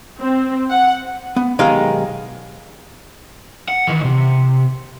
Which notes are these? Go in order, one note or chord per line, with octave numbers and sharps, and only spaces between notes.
C4
F#5
B3
B1 D#3 G#3 D#4 G4 F5
F#5
D#3 E3
C3